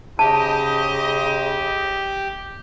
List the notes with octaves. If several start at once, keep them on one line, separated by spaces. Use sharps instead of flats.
C#3 D#4 G4 C5 D#5 A5